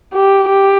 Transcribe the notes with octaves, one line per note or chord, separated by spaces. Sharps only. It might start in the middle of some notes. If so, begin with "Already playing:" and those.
G4
G4